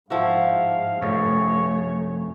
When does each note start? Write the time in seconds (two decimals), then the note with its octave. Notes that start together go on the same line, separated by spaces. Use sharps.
0.10 G#2 F3 E4 F#4 F5
1.02 F1 F#2 A3 C#5